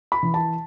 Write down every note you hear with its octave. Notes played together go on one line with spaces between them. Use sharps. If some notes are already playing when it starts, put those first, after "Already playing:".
B5
E3
A5